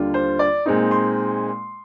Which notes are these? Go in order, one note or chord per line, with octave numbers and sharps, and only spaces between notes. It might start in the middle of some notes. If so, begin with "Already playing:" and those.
Already playing: D#2 D3 G3 D4 F4
C5
D5
A#2 G#3 C4 D#4
C6